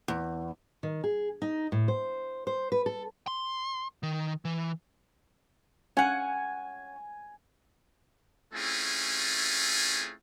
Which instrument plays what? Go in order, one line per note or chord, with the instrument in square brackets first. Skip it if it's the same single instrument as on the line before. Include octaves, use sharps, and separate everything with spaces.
[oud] E2
[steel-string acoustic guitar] D#3
G#4
D#4
A2
C5
C5
B4
A4
[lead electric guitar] C6
D#3
E3
[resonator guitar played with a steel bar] C#4 F#5 [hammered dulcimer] G#5
[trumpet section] A3 C4 C#4 E4 F4 G#4